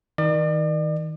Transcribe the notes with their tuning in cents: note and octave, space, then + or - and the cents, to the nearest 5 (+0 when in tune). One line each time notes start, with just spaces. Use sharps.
D#3 +30 D5 +40